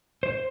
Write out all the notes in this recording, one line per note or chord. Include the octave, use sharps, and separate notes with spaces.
C5